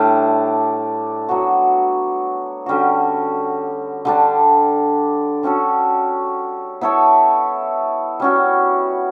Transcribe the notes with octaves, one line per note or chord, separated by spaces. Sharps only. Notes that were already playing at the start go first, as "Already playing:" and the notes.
Already playing: A2 G3 D4
F#3 B3 F#4
D3 G3 C#4 F#4
D3 G3 D4
G3 C#4 F#4 A4
B3 E4 A4 C#5
G3 C#4 F#4